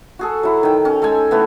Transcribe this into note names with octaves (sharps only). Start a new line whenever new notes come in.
F#4 G#4 A4
F#3 E4
D#3 G5
C#4
G#3 A4 G5 G#5
E3 A3 B3